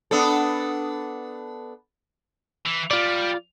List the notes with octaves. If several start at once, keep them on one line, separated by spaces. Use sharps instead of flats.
B3 D4 A4
E3
G3 F4 D5